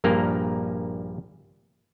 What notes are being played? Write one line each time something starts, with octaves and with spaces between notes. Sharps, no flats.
A#1 G2 A#2 A#3 A#4